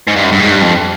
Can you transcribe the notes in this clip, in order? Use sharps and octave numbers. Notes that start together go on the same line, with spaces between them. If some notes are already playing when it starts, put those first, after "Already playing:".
G#2
G2
F#2
G2
G#2
G2
F2